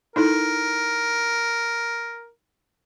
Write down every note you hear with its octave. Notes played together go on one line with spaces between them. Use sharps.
D#4 E4 A4 A#4